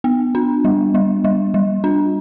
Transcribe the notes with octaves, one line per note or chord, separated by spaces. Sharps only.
B3
D4
G3
G3
G3
G3
D4